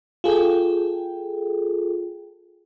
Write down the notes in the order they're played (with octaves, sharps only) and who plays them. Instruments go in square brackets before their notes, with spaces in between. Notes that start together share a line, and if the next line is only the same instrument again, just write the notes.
[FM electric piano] F4 G#4 A4 G5